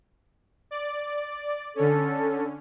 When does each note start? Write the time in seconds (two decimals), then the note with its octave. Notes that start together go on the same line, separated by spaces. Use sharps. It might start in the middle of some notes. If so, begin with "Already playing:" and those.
0.71 D5
1.75 D3 C#4 A4